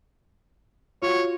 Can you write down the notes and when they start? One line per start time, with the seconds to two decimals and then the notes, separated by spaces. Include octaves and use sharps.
1.02 F4 F#4 C#5